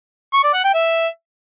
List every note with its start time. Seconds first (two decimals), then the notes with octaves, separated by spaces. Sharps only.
0.33 C#6
0.44 D5
0.54 F#5
0.64 G5
0.75 E5